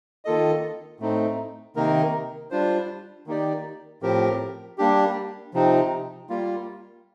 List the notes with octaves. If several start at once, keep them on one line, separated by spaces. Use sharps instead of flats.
D#3 A#3 F4 A4 D#5
A2 A3 C4 D#4
C3 D#3 A#3 D#4 A#4
G3 D4 F4 C5
D#3 A#3 D#4 G4 D5
A2 F3 C4 G4 A#4
G3 A#3 D4 G4
C3 F3 C4 D#4
G3 A#3 F4